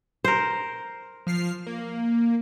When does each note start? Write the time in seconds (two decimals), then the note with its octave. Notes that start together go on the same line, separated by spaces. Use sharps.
0.24 A#4 C5
1.27 F3 F6 C7
1.67 A#3